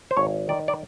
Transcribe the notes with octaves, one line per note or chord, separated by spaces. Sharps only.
C5
G#1 C#5
D#3 D5
D5